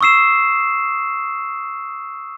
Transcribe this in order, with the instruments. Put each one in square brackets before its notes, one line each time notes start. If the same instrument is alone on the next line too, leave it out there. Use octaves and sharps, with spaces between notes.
[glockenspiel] C#6 D#6 E6 C7 E7